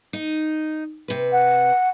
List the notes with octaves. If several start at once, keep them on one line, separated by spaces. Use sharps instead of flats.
D#4
C3 B4
F#5